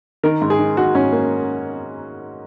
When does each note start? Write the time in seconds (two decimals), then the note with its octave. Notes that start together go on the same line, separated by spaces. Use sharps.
0.24 D#3 A#4
0.41 G#2
0.50 G#4
0.59 D#3
0.77 D#3 F#4
0.95 G#2 C#4
1.12 A#3